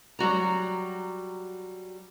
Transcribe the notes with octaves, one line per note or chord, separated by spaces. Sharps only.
F#3 G3 F#4 A#5